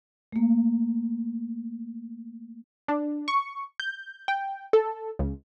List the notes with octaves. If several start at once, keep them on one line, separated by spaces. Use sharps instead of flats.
A3 A#3
D4
C#6
G6
G5
A4
C#2